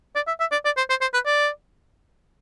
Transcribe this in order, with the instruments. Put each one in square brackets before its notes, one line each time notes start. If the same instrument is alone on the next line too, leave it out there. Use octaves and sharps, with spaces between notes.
[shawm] D5
E5
E5
D5
D5
C5
C5
C5
B4
D5